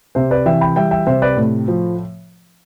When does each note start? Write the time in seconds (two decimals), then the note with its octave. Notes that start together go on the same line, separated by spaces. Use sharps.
0.15 C3 C5 E5
0.31 B4 D5
0.46 E3 E5 G5
0.61 G5 B5
0.76 G3 E5 G5
0.91 E5 G5
1.07 C3 C5 E5
1.22 B4 D5
1.37 A2
1.68 F3